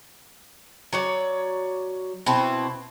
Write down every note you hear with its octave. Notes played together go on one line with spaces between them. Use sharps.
F#3 C#5 D5
B2 C4 E4